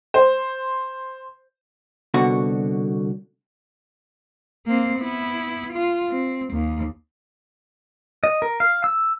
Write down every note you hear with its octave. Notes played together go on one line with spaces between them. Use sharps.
C5
C2 B2 D3 F#4
A#3 C4
B3 E4
F4
C4
D#2
D#5
A#4
F5
E6